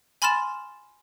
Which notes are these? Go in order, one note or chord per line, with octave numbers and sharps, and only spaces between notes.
G#5 B5 C6 F6 A6 E7